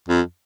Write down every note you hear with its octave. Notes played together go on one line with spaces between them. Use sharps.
F2